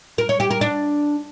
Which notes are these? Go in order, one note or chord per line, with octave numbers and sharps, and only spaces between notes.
A#4
C#5
G4
A#4
D4